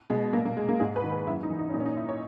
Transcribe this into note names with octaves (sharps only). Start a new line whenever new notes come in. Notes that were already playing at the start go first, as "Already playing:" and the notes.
B2 G#3
A#2 A#3
A#3
G#3
A#3
G#2 G#4
B4
D#3
B4
F#2 E4
D#4
E3
D#4
C#4
A#2 D#4
C#4
D#4
E4
C#5